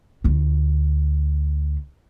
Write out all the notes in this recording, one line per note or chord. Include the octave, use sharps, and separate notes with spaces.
D2 F4